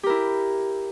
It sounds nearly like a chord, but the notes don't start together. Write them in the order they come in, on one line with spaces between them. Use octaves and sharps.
G4 A#4 E4